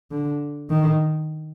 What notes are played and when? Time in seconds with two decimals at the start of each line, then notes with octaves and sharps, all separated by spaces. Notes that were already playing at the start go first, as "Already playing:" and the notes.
0.11 D3
0.70 D#3